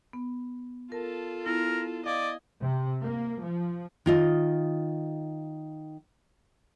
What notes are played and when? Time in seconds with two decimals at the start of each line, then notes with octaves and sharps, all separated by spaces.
0.13 B3
0.92 F4 A4 A#4 A5
1.46 B3 E4 A#4
2.06 D5 D#5 F5 G#5
2.60 C3
3.02 A#3
3.43 F3
4.06 D#3 F4 D#5